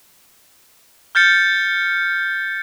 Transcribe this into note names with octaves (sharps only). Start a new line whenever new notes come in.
F6 G6 A6 C#7